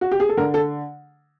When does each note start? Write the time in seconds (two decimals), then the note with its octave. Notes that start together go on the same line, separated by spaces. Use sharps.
0.01 F#4
0.11 G4
0.20 G#4
0.29 A4
0.37 D3 A#4
0.54 A4